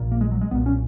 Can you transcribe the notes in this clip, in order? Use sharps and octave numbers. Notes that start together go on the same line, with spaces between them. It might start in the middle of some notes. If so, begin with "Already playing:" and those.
Already playing: A#1 A#2
A#3
G#3
F#3
G#3
B1 A#2 B3
C#4